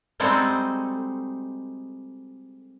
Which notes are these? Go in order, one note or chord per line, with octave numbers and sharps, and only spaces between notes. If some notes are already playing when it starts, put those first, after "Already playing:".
G3 G#3 C4 D#4 F#4 A4